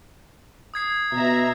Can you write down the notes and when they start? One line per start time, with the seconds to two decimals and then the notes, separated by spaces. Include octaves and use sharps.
0.74 D#6 G#6 C7
1.12 B2 E5 A#5